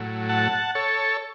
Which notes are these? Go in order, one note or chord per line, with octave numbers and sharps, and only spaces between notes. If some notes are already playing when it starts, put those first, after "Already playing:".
Already playing: A2 F#3
F#5 A5
A4 C#5